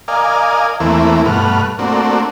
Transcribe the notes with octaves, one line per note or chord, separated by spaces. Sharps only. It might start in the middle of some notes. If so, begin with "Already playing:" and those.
A#4 D5 D#5 F5 G#5
E2 E3 A3 A#3 C4 E4
G2 B2 A3 B4 F#5 F6
A3 A#3 C4 D4 F#4